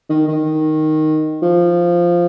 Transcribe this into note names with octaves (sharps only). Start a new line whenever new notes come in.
D#3
D#3
F3